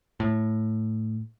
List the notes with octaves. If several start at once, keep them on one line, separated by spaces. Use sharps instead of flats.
A2